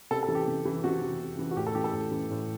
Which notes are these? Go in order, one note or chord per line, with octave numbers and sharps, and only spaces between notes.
C3 A4
A4
E3
G4
C3
E3
C3 F#4
E3
C3
E3
F#4
A2 G4
A4
E3 G4
A4
A2
E3
A2